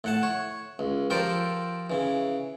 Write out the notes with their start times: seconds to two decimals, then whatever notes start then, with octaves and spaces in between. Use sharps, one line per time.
0.04 A2 F#5 A5
0.23 C#5
0.79 C#2
1.10 F3 G4 A4 A#4 C5 D5
1.90 C#3 E3